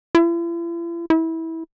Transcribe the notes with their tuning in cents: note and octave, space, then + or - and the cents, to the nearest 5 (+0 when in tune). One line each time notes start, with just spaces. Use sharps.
E4 +45
E4 -20